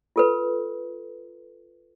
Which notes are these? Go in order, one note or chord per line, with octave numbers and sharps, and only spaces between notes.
F4 A4 B4